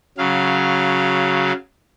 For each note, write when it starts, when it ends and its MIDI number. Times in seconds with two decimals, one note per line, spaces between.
0.18 1.52 49
0.18 1.52 54
0.18 1.52 77